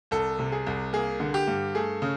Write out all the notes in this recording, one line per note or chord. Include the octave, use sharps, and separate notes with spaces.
C2 A4
C3
G#4
C2
A#3 G#4
D3
G4
G2
A3 G#4
C#3